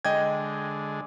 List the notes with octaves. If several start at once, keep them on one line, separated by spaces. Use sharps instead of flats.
D3 G#3 D#5 G5 G#6